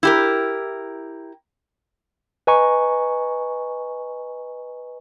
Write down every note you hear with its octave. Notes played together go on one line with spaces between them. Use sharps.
E4 G4 A#4
B4 D#5 G#5 A#5 C#6